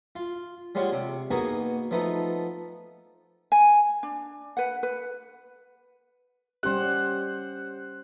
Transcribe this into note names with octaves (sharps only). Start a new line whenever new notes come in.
F4
G3 G#3 F4 C#5 F#5
C3
A#3 B3 D#4 F#4 G#4 G#5
F3 A3 B3 D#4
G#5
D4
B4 F#5
B4
G3 C#4 G4 C5 F#5